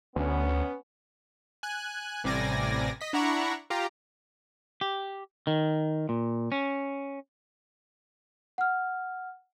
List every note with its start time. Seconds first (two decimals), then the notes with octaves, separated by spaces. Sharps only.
0.16 D2 B3 C#4
1.63 G#5 F#6
2.24 A1 C3 G3 D5 G#5 A#6
3.01 D#5 B6
3.13 D4 E4 F#5 A#5 B5 C#6
3.70 F4 G4 A#5
4.81 G4
5.47 D#3
6.09 A#2
6.52 C#4
8.58 F#5 F6